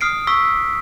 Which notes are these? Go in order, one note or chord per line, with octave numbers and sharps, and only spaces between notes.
D#6 F6 C7 D7
C#6 E6 B6